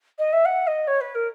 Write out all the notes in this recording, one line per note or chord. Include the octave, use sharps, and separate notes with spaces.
D#5
E5
F#5
D#5
C#5
B4
A#4